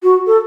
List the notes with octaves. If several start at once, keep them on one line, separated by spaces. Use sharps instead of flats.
F#4
A4